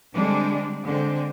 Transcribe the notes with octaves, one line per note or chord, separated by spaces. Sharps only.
D3 G3 G#3 C4 D4
D3 G#3 C4